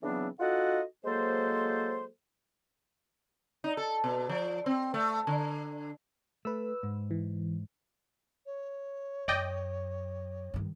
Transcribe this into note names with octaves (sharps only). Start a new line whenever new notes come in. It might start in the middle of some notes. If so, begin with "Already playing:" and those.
C#3 E3 F#3 B3 C4 D4
D#4 F4 F#4 A4 D#5 F#5
F#3 G#3 A#3 A4 C5
D#4
A4
B2
F3
C4
A3
D3
A3 B4 E6
G#2
E3
C#5
F#2 D5 D#5 G5
G2 D#3